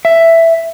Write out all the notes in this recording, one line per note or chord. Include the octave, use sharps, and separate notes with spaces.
E5